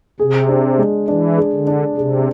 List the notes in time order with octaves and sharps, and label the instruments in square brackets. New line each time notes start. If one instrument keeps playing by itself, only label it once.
[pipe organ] C3 [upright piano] G#4
[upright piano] D4
G#3
[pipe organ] E3 [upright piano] D4
[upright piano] G#4
[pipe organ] D3
[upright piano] D4
[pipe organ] C3 [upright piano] G#4